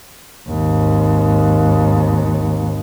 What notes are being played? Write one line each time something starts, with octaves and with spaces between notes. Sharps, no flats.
G#1 D#2